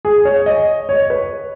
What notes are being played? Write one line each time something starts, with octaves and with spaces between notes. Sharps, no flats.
G#4
C#5
D#5
C#5
B4